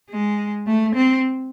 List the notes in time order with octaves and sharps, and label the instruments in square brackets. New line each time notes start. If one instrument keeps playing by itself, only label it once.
[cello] G#3
A3
C4